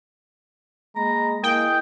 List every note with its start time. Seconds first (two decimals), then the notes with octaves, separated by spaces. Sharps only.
0.96 G#3 A#3 A#5 B5
1.43 A#3 E4 G#4 D#5 G5